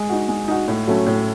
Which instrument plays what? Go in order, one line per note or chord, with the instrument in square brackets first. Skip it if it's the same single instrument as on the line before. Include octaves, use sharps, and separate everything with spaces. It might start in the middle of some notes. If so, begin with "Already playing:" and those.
Already playing: [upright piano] G#3
D#4 F#4
G#3
D#4 F#4
A2
F#3 A3 C#4
A2